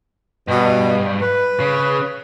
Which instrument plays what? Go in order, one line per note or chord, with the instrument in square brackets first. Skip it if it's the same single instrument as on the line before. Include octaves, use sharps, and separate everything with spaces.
[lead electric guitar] G2 [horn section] B2
[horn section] B4
[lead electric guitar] C#3